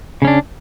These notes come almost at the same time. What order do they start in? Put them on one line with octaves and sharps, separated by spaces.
C#3 C#4 D4